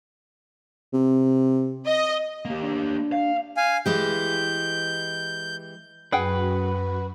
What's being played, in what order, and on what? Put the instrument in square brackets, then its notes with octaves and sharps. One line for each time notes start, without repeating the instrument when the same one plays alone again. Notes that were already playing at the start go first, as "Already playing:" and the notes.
[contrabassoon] C3
[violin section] D#5
[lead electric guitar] A#3 G4
[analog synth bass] D4
[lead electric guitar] F5
[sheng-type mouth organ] F5 G#5
[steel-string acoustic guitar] E3 G#3 G4 [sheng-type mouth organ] G6
[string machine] F#2 F#4 [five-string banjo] G#4 F#5 G5 [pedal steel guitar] B4